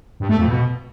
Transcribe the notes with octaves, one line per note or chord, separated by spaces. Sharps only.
G2
A3
F2
B2